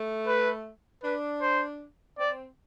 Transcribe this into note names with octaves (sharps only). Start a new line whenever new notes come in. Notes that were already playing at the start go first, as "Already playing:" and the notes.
Already playing: A3
B4
D4 B4
C5
C4 D5